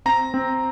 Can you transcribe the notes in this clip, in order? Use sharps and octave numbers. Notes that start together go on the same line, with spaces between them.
C4 A#5
C4